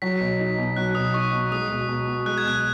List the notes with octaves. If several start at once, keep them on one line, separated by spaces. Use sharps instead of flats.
F#3 B6
B1
D#4
B2
F#3 F#6
B1 D#6
D#4 C#6
B2
G#3 D#6
B1
B1
B2
G#3 F#6
G#6
B1 F#6